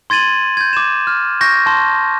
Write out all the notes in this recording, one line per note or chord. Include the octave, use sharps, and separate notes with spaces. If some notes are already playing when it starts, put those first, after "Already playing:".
C6 G#6 A6 D#7 F#7
G6 G#6
D6 E7
F6
C#6 G6 A#6
A5 C6